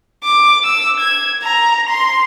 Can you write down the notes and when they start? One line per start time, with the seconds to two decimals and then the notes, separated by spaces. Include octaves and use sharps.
0.23 D6
0.64 E6
1.00 G#6
1.43 A#5
1.89 C6